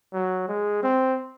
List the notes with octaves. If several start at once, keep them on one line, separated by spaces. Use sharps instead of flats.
F#3
G#3
C4